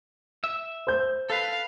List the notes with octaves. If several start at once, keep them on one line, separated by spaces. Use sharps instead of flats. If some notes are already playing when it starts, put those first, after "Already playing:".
E5
C5 G6
A4 B4 F5